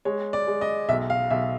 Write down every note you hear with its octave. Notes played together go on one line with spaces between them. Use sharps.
G#3 C#5
D5
G#3
D#5
B1 E5
F5
B1 E5